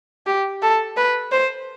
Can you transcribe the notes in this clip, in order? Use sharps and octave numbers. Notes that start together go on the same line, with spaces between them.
G4
A4
B4
C5